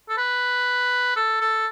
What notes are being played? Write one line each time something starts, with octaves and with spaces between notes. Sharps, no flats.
A4
B4
A4
A4